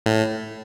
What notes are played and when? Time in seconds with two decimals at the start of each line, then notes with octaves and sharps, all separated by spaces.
0.06 A2